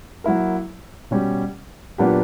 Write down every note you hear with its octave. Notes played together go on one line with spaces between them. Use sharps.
F#3 A#3 E4 A#4
B2 G3 C#4 G4
A#2 F#3 B3 D4 G4